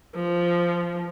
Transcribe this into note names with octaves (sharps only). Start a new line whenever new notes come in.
F3